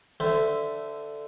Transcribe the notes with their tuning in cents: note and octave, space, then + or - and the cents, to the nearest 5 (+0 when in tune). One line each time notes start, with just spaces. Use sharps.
D3 +0 C5 -25 E5 +0